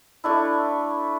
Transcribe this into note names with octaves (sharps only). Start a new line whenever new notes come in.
A3 D4 E4